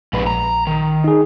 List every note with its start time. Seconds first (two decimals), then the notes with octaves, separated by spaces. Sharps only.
0.13 A#1 G#2 B4
0.27 A#5
0.67 D#3
1.04 D#4 G#4